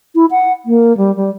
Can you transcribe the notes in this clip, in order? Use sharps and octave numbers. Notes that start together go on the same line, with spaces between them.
E4
F#5
A#3
G3
G3